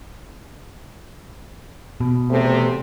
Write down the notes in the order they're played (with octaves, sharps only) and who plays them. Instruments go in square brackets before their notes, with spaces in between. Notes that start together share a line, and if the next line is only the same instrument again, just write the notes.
[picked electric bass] B2
[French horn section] E2 C3 A3